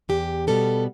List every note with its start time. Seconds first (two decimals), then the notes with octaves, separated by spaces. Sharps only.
0.09 E2 G4
0.47 B2 G3 B3 A4